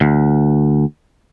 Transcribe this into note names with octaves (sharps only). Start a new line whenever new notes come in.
D2